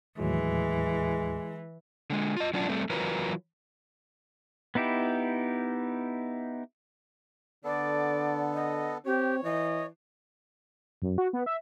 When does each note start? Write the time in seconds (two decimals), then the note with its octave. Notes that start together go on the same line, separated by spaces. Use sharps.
0.19 D#2 A2 E3 F#3 G#3
2.10 D3 G#3
2.36 F4 D#5
2.53 F#3 C#4 D4 F4 F#4
2.69 G3 A3 C4
2.90 E3 F#3 F4 A#4 B4
4.75 B3 D#4 E4 G4
7.64 D3 B3 A4 D5
8.54 D#5
9.06 C4 G4 C#5
9.43 E3 D#5
11.02 F#2
11.18 F#4
11.33 B3
11.46 E5